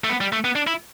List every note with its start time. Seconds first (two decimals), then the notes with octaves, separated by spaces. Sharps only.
0.04 A3
0.10 B3
0.21 G3
0.33 A3
0.44 B3
0.55 D4
0.67 E4